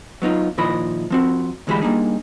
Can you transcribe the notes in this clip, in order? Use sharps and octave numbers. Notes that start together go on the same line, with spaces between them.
F#3 B3 D#4 F4
A#2 D#3 F3 E4 D#5 B5
F3 C4 F#4
D2 E3 G#3 F#4 G4 B5
G3 A#3 D4 D#4 G#4